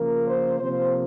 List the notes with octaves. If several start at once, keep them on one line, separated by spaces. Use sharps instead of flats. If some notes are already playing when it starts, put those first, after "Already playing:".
Already playing: C#3 F3 A#3 A#4
C5
C3 F3 A#3 C5